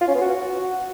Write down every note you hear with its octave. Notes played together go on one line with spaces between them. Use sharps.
F4
C#4
B3
F#4